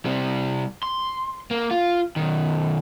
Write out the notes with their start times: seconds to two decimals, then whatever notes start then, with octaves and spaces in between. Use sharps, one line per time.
0.05 C3 G3
0.83 C6
1.51 A#3
1.71 F4
2.16 B1 D#3